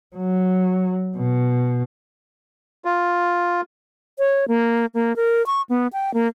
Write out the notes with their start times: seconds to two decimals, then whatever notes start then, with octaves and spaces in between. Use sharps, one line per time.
0.16 F#3
1.17 B2
2.85 F4
4.19 C#5
4.48 A#3
4.94 A#3
5.16 A#4
5.46 C#6
5.69 B3
5.93 G5
6.14 A#3